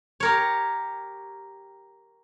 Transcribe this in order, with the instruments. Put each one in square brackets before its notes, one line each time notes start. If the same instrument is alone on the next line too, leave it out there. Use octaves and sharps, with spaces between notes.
[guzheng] G4 A#4 C#5